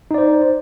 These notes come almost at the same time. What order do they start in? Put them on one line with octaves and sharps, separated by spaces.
D#4 D5 C5